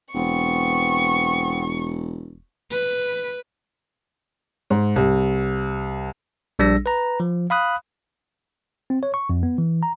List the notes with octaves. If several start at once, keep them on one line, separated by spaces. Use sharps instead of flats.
E1 B3 C4 C#6
B4
G#2
C2
A#1 G3 D4 E6 A#6
B4 A#5
F3
F5 B5 D#6 F#6
C4
C#5
C#6
F2
B3
E3
A#5